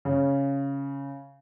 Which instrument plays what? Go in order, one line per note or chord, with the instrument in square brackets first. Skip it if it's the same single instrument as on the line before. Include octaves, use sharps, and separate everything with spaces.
[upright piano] C#3